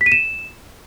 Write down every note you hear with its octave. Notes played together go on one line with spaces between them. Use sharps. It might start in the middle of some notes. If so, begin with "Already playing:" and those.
B6
D#7
E7